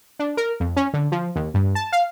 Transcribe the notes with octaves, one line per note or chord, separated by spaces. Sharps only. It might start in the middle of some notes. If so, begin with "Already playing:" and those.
D4
A#4
F2
C#4
D3
F3
D#2
G2
A5
F5